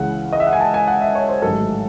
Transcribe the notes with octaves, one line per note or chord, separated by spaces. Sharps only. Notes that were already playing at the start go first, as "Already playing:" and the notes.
Already playing: C#2 C#3 E3 F#5
D#5
E5
F#5
G#5
A5
G#5
F#5
E5
C#5
C5
A1 G#2 D#3 F#3 A4